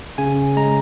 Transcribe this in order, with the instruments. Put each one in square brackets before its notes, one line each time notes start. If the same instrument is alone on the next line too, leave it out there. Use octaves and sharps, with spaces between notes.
[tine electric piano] C#3 G#5
G#3 A#5